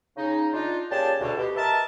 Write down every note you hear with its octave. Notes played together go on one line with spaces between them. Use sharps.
C#3 D#4
D4 D#4 F4
A#2 C#4 G4 G#4 A5
D2 B2
B2 G4
A#4 D#5 E5 A5